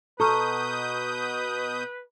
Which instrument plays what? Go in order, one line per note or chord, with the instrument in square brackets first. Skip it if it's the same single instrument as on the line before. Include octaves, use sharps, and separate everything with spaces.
[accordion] B2 D#6 G6 [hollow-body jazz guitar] A4 [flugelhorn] B4 [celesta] A#5 C#6 F6